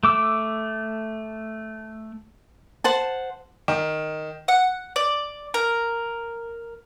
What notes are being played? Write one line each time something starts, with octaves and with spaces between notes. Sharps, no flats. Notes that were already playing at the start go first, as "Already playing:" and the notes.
A3 D6 E6
C5 F#5 A5
D#3
F#5
D5
A#4